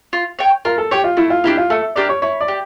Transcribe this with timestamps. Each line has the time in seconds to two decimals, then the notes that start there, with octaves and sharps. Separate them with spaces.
0.13 F4
0.39 C#5 G5
0.65 F4 A#4
0.78 A4
0.91 G4 C#5 G5
1.04 F4
1.17 A3 E4
1.30 F4
1.44 D4 E4 G4 A#4
1.57 F4
1.70 A3 A4
1.96 D4 G4 A#4 D5
2.09 C#5
2.22 E4 C#5
2.41 D5
2.48 G4